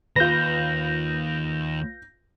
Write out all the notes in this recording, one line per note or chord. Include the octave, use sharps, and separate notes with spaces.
D#2 F4 B4 G6 A#6